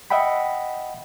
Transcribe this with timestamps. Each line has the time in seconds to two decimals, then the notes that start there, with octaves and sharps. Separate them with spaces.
0.10 D#5 E5 F#5 G5 B5